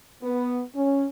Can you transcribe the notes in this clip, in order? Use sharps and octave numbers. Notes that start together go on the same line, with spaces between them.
B3
C#4